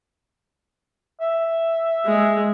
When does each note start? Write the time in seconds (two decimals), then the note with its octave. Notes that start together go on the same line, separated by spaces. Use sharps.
1.21 E5
2.05 G#3